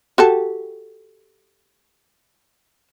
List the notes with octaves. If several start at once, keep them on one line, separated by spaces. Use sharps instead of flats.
F#4 G4 A4